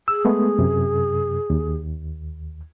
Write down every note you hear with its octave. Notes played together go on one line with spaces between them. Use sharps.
G#4 E6
G#3 A3 B3
F#2 C3
D#2